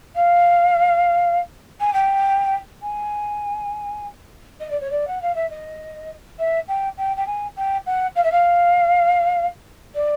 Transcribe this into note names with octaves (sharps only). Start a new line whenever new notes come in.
F5
G#5
G5
G#5
D#5
D5
C#5
D5
F#5
F5
E5
D#5
E5
G5
G5
G5
G#5
G5
F#5
F5
E5
F5
D5